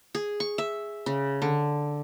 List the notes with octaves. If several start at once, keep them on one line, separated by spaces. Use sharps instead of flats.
G#4
C#6
E5
C#3
D3